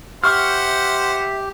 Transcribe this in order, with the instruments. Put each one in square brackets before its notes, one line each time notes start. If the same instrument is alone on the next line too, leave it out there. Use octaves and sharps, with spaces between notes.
[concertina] G4 [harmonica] C5 F#5 [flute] E5 [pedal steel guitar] C#6 F6